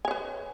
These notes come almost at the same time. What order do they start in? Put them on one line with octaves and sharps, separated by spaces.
G#5 C#5 B4